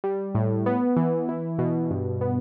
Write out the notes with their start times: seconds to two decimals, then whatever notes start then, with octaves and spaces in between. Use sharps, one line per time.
0.04 G3
0.35 A2
0.66 B3
0.97 E3
1.29 E4
1.59 B2
1.91 G2
2.21 B3